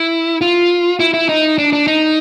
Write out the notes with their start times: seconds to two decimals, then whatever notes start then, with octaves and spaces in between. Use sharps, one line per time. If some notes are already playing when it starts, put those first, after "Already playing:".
Already playing: E4
0.41 F4
1.00 E4
1.14 E4
1.29 D#4
1.58 D4
1.73 D4
1.87 D#4